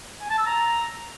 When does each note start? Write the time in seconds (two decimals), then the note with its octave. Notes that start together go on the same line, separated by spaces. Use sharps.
0.21 G#5
0.30 A5
0.38 E6
0.46 A#5